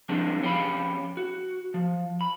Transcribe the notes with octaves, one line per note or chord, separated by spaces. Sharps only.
F3 G3 G#3 C4 D4
F2 C#4 G4 A4 F5 B5
F#4
F3
B5